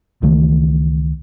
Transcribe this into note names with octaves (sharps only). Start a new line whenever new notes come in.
C#2 D#3 E3 A3